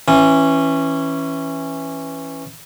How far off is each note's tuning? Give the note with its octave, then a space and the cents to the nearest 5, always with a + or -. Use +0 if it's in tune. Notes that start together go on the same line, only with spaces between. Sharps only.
E3 +0 C#4 -15